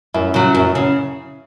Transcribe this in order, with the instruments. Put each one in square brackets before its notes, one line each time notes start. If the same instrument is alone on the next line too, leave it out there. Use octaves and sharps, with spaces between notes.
[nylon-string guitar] F#2 [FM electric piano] E4
[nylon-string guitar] C#3 F#3
F#2
C#3